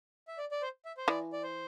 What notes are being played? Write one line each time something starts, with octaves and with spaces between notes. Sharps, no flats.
E5
D5
D5
C5
E5
C5
E3 D5
D5
C5